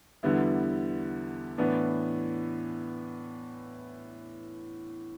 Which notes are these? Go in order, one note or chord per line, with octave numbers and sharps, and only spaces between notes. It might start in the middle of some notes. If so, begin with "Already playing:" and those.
E2 D3 G3 B3 E4
A2 E3 B3 D4